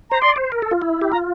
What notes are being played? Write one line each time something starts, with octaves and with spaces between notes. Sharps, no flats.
C5 A#5
D5 C6
C5
A#4
A4
F4
E4
G4
F4 A#5